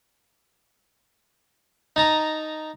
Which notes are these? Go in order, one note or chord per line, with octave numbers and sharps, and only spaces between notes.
D#4 A5 A#5 D#6